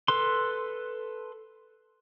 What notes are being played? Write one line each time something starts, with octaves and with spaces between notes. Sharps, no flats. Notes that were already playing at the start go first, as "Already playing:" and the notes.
A4 B4 C6